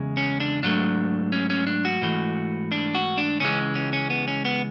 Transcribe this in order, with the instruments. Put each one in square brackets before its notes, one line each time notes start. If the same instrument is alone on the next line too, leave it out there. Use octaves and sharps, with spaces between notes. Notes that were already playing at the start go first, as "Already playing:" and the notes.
Already playing: [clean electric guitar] E2 C#3 G#3
C#4
D4
G#2 F#3 A3 D4
C#4
C#4
D4
F#4
G#2 E3 A3
D4
F#4
D4
C#2 C#3 E3 G#3 C#4
C#4
C#4
B3
C#4
B3